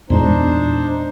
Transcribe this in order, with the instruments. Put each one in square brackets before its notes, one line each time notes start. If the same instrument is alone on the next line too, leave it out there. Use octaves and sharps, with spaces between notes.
[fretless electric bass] E2 A#2 G#3 [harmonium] D4 D#4 C5